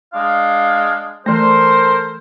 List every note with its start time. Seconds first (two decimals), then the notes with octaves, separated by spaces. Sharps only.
0.14 G#3 D4 F5
1.26 E3 A3 A4 A#4 C5